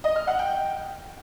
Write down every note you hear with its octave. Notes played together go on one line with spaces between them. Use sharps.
D#5
F6
F#5
G5